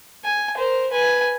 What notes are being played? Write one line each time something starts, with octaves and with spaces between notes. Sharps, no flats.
G#5
A#4 C5
B4 G#5